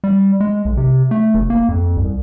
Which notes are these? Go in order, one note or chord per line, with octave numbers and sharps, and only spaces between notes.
G3
G#3
B1
C3
A3
F1
A#3
F2
C2